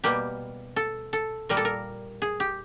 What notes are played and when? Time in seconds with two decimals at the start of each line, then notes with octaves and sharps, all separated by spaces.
0.04 B2 G3 A#3 G4
0.76 A4
1.13 A4
1.49 A#2 G3 A#3 A#4
1.57 A4
1.65 A#4
2.22 G#4
2.40 G4